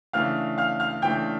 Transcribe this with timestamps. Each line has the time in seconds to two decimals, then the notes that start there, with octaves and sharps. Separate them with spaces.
0.13 C#3 E3 A3 D4 F5 F6
0.58 F5 F6
0.80 F5 F6
1.02 C#3 E3 A3 D4 G5 G6